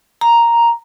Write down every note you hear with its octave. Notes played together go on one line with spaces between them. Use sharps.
A#5